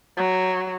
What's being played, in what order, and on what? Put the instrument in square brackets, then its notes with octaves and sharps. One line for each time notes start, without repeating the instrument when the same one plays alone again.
[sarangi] F#3